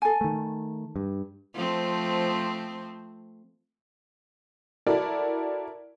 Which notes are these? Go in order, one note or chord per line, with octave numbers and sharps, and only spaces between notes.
A4 G#5
D#3 A3
G2
F3 A3 C4
E4 F#4 A4 A#4 D5